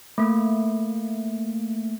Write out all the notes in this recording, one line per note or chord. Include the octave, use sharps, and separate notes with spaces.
A3 A#3